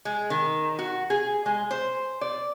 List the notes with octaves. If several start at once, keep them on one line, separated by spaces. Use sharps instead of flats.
G#3
D#3
F#4
G#4
G#3
C5
D5